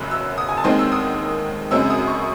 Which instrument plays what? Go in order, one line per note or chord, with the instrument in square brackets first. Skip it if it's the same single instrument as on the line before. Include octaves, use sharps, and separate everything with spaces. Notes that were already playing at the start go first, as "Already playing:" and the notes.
Already playing: [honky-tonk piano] F#1 F#2 C#3 E6 F#6
E6
D#6
G#5
A5
D#2 D#3 G#3 C4 C6
E6
D#6
F#2 C#3 G#3 C4 E6
D#6
C#6